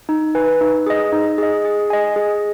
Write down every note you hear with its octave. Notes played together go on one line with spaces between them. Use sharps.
D#4
B4 G#5
D#4
G#4 D#5
D#4
G#4 D#5
G#4
D#5 G#5
G#4